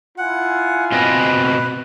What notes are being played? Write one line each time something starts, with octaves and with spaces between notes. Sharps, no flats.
E4 F4 F#5 G#5
B2 C4 B4 D#5